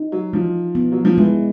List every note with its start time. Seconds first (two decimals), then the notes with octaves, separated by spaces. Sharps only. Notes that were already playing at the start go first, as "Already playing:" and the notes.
Already playing: D#4
0.12 F#3
0.33 E3 F3
0.75 B3
0.92 F#3
1.05 F3
1.18 E3 G#3